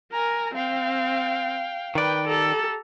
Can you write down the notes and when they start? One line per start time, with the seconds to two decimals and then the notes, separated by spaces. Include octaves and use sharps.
0.13 A#4 G#5 A#5
0.54 C4 F5 G5
1.95 D#3 B4 D5 G5
2.28 G4 A4 A#5